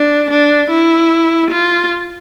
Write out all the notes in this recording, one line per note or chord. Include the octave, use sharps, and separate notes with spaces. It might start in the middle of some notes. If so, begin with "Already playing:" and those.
Already playing: D4
D4
E4
F4